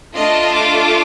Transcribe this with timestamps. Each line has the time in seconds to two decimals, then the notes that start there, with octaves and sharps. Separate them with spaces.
0.15 A3 D4 F4 A4 D#5
0.57 D6